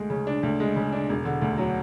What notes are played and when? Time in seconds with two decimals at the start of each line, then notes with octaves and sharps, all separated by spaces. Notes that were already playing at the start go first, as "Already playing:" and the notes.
Already playing: D2 G#3
0.10 C#3
0.27 D4
0.43 D2
0.60 G#3
0.76 C#3
0.93 D4
1.09 E1
1.25 D3
1.42 D2
1.58 F#3